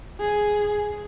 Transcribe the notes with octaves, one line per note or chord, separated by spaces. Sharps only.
G#4